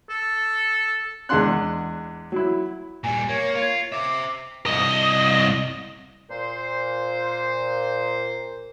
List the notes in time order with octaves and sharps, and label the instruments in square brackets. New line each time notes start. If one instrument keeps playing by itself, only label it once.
[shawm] A4
[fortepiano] E2 G#3 D4 F#5 C6 F#6
F#3 E4
[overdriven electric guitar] A#2 G3 [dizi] G#5
[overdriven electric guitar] A#3 [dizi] C#5
[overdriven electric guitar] F4
[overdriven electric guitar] C5 E5 [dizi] D6
[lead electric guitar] C2 D#5
[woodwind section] A#2 C5